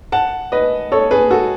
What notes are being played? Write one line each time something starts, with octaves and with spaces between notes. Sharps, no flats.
F#5 A5
B4 D#5
A4 C#5
G#4 B4
F#4 A4